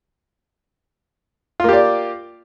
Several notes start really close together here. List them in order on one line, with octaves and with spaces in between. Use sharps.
F4 A#3 G4 D5